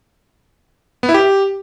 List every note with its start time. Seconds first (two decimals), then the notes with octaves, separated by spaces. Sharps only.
1.03 B3
1.09 E4
1.14 G4